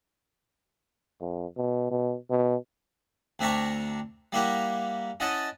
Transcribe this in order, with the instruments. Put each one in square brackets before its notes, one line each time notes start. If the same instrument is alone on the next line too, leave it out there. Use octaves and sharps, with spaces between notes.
[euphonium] F2
B2
B2
B2
[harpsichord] D2 C4 D4 E5 A#5 C#6
G3 A#3 E4 G4 A#4 F#5
C#4 E4 D#5 F#5 A5